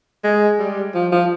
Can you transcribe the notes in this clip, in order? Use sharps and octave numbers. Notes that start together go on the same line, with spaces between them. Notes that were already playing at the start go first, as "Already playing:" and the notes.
G#3
G3
F3
F3